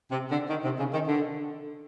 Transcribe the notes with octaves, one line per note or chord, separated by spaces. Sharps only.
C3
D3
D#3
C3
C#3
D#3
D3